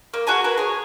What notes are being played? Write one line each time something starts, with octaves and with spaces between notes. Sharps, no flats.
A#3
F#4 G#4 G#5 A#5
A#4 B4
G#4 C#5